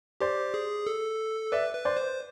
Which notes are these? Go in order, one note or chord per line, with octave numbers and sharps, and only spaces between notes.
G4 C5 D5
G#4
A4
B4 D5 E5
B4
C5 D5
C5